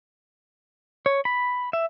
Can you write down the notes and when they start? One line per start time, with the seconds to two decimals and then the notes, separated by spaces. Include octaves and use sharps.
1.06 C#5
1.25 B5
1.73 E5